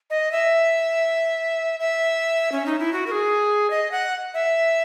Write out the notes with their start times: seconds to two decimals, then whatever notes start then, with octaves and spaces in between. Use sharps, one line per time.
0.10 D#5
0.32 E5
1.80 E5
2.52 C#4
2.66 D#4
2.79 E4
2.93 F#4
3.07 A#4
3.11 G#4
3.70 D#5
3.92 F#5
4.34 E5